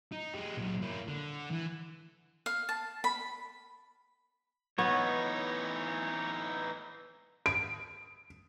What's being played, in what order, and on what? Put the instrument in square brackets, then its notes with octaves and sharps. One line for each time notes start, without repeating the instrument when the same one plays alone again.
[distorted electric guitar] D#4
G#3 G4
A#2 F#3
A#3 E4
D3
E3
[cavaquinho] F5
A5
B5
[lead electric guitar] E3 D#4 [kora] B3 [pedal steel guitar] C#5
[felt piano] D7